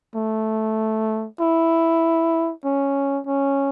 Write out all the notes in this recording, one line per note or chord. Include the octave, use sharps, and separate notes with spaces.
A3
E4
C#4
C#4